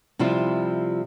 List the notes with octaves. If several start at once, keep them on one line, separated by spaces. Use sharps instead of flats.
C3 F3 G3 E4 F4